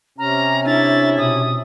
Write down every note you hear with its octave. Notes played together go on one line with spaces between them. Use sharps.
C3 C#4 A#5 F6
D4 E4 A6
B2 D#6